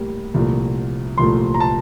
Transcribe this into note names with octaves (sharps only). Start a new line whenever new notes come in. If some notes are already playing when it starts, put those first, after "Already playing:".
Already playing: A2 G3 A#3
C2 A#2 F3 A3
C2 A#2 F3 A3 C6
A#5
A5